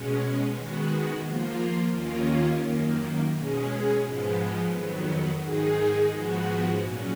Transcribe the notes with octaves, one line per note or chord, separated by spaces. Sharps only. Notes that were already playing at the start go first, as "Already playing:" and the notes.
Already playing: B2 G#3 C#4
D#3 G#3 B3 F#4
F3 A#3 F4
D#2 D#3 A#3 C#4 F4
F#2 D#3 A#3
B2 G#3 C#4 G#4
G#2 F3 G#3 B3
F2 D#3 F#3 B3
G#2 D#3 G#3 D#4 G#4
G#2 F3 G#3 B3 F#4
A#2 F#3 C#4